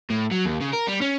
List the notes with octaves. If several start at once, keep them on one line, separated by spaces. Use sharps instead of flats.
A2
F#3
D#2
C#3
A#4
G3
C#4